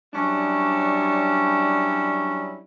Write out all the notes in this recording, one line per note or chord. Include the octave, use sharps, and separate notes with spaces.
F#3 G3 C#4 D4 E4